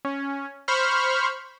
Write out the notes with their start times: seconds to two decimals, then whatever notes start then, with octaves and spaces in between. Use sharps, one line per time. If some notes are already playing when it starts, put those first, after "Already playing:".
0.05 C#4
0.68 C5 B5 C#6 F6